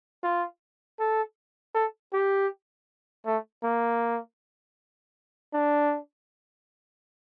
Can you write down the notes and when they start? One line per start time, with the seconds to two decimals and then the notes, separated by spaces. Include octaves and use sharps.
0.23 F4
0.99 A4
1.74 A4
2.13 G4
3.26 A3
3.63 A#3
5.53 D4